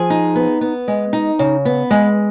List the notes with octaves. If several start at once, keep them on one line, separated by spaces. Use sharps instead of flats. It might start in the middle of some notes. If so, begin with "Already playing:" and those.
Already playing: F3 G#4 G#5
D#4
B3
B3
G#3
D#4
C#3
B3
G#3